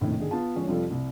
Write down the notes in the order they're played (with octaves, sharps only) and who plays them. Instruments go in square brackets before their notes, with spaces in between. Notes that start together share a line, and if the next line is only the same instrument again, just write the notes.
[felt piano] F1 A#1 F2 A2 D#3
G1 D3 D#3 G#4
B3 F4 A5
D3 F3 G#3 C#4 C#5
F2 C3 F3 G3 F4 A4
C2